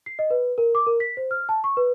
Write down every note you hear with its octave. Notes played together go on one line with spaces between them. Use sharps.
C7
D#5
B4
A#4
D6
A#4
B6
C5
F6
A5
C#6
B4